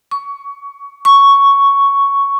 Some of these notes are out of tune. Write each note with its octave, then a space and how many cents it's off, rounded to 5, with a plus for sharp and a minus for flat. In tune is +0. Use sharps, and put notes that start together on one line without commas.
C#6 +20
C#6 +5